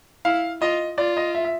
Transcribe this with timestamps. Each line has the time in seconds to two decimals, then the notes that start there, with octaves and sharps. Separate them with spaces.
0.25 E4 F5
0.61 F4 D#5
0.98 F4 D5
1.17 D#5
1.35 E5
1.45 E5